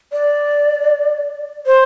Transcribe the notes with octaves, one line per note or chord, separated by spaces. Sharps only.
D5
C5